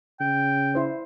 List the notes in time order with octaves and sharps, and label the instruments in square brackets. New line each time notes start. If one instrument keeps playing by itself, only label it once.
[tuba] C#3 [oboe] G5
[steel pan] E4 C5 D5